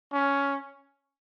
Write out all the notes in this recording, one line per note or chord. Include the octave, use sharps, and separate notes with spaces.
C#4